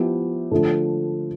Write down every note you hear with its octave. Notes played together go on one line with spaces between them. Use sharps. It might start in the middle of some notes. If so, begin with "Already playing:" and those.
Already playing: F3 B3 E4 G4
D3 F3 A3